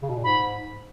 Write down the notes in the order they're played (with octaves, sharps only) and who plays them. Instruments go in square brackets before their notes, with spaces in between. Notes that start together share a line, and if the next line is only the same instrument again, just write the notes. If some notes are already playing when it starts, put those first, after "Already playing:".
[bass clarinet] C#3
B2
A#2
[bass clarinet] G#2 [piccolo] B5